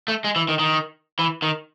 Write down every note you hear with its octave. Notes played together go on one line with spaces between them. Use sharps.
A3
G#3
E3
D#3
D#3
E3
D#3